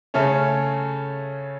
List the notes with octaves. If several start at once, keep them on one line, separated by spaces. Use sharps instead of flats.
C#3 A3 C#4 A4